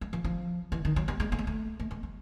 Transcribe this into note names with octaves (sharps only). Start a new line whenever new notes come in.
G3
F3
F3
E3
D#3
F#3
G3
G#3
A3
G#3
A3
A3
G#3
G3